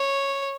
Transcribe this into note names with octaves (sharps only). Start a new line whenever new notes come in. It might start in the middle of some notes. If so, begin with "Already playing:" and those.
Already playing: C#5